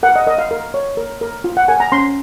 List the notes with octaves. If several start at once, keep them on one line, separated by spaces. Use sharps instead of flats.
A#4 F#5
D#5
A#4 D#5
F5
A#4
C#5
A#4
A#4
F4
F#5
A#4 G#5
A#5
C#4 C6